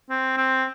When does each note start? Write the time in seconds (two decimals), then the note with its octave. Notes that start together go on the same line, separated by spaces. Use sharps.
0.10 C4
0.37 C4